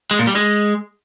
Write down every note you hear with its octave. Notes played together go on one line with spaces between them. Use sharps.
G#3
A#2
G3
G#3